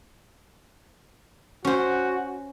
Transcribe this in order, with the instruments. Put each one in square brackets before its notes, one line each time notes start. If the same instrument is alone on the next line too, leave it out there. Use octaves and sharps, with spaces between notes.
[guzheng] C#4 C5 [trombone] F#4